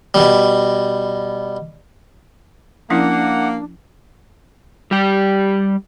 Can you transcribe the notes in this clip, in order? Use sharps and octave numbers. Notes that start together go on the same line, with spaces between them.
B2 G3
F3 A#3 C#4 D4 E4 F#5
G3 G4